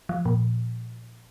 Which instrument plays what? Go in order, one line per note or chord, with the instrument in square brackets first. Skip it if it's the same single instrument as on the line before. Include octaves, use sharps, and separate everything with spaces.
[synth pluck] F3
A#2